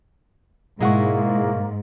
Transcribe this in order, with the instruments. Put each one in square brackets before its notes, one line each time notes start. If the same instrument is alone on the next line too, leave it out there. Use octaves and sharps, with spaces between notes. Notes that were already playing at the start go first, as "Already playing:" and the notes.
[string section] G#2 [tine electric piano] B2 C#6 [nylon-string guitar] G#3 E4 F#5 [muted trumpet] A#3